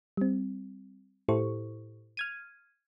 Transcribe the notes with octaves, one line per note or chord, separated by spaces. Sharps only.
G3 C4
A2 E4 G4 A4 C5 C#6
F6 G#6 D#7